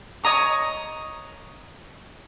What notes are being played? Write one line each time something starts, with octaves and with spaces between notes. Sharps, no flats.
C#5 D#5 A#5 C#6